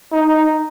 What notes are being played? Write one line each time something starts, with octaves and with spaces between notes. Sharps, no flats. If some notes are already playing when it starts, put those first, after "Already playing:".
D#4